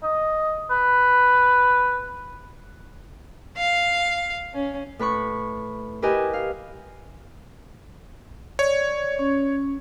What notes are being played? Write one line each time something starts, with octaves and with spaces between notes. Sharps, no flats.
D#5
B4
F5
C#4
A2 B4 B5 C#6
E4 G4 A#4 B4 D#5 G#5
F5
C#5 D5
C#4